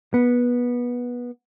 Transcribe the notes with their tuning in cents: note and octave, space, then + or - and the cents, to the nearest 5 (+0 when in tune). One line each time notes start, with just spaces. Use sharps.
B3 -20